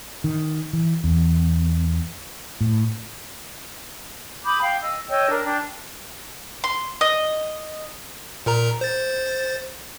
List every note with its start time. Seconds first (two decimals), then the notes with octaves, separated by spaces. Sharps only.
0.24 D#3
0.73 E3
1.04 E2
2.61 A2
4.45 B5 D6 D#6 G6
4.61 F5 G5
4.82 D#5 E6
5.09 C#5 D#5 G5 E6
5.30 D4 A#4
5.45 D4 G5
6.64 C6
7.01 D#5
8.46 A#2 A#4 A#5
8.81 C5 A6